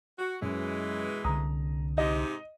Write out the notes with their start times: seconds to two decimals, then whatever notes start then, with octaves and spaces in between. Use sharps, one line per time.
0.19 F#4
0.42 F#2 B2 E3 G#3
1.24 C2 D3 A#5 D#6
1.98 G#2 C3 D#4 D#5